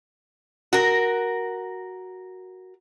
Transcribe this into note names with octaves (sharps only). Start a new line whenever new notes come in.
F#4 A#4